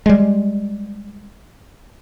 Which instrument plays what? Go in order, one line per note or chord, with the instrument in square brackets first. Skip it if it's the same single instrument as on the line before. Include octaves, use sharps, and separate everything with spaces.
[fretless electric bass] G3 G#3